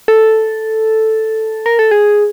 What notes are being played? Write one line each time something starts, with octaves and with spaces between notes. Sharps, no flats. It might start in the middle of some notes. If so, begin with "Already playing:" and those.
A4
A#4
A4
G#4